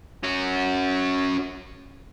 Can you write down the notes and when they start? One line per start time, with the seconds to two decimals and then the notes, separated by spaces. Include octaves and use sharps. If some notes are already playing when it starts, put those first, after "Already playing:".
0.23 C#4 F#4